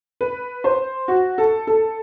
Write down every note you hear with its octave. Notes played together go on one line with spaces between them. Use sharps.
B4
C5
F#4
A4
A4